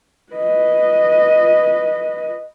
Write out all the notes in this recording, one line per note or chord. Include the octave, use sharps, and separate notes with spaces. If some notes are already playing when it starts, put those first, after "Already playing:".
B4 D#5